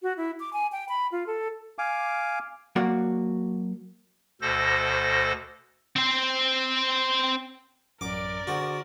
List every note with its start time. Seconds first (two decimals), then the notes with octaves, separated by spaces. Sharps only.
0.02 F#4
0.17 E4
0.40 D6
0.53 G#5
0.72 G5
0.89 B5
1.12 F4
1.27 A4
1.78 F5 G#5 D6
2.76 F#3 A#3 F#4 D5
4.41 D2 B2 A4 C5 A#6
5.96 C4 C5
8.01 A1 F#2 A#4 D5 D6
8.47 D3 F#4 G#4 C5